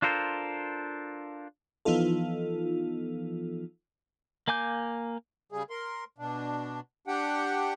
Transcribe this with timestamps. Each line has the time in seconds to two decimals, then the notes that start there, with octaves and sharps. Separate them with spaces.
0.02 D4 F4 A4 A#4 C5
1.85 E3 F3 B3 D#4 F4 A4
4.48 A#3 F5 G#5 D6 G6
5.52 C#3 G3 G#4
5.70 A#4 C6
6.18 B2 D4
7.07 D4 G4 F#5 G5